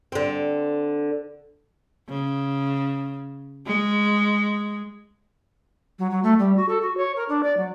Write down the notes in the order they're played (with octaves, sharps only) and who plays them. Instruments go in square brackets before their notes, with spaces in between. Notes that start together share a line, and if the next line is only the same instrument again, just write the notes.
[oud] D3 C4
[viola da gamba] C#3
G#3
[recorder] F#3
F#3
A3
G3
F#4
A4
F#4
C#5
A#4
D4
D5
F#3